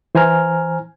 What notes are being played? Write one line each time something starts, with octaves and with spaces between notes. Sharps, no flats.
E3 C5 G#5 A#5 F6